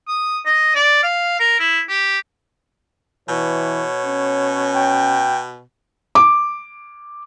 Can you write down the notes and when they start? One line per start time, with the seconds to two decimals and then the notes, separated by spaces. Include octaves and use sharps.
0.08 D#6
0.46 D#5
0.75 D5
1.03 F5
1.40 A#4
1.59 E4
1.89 G4
3.29 B2 E3 C#5
4.06 C#4
4.74 G5
6.15 D6